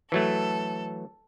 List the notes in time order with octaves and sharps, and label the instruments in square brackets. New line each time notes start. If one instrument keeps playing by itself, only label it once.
[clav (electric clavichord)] E3 F#3 A3 [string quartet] A4